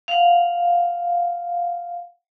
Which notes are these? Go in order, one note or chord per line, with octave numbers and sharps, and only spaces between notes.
F5 F#5